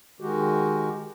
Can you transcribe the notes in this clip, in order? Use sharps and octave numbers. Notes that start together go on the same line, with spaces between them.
D#3 G#3 F#4 G4